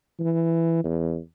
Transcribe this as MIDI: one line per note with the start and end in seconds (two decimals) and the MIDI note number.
0.20 0.82 52
0.84 1.18 40